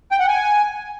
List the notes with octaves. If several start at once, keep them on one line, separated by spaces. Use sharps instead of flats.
G5
F#5
G#5